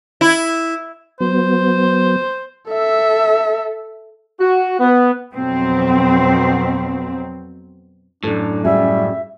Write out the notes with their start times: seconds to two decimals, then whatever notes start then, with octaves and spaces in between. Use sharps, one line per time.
0.21 E4
1.20 F#3 B3 C5
2.68 A4 E5
4.40 F#4
4.80 B3
5.34 F2 B2 F#3 C4
8.24 F#2 A2 D4 A4
8.65 G3 C#4 F#4 G#4 E5